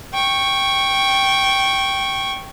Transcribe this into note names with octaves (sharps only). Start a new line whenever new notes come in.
G5 C#6